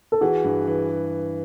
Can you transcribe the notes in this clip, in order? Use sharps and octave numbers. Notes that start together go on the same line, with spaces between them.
A4
E3 F#4 G#4
G2
E3